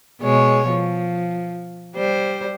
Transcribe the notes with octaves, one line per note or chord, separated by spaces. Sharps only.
B2 G#3 C#5
F3
G3 C5